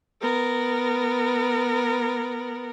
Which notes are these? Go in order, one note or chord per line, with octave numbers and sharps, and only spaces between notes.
B3 A#4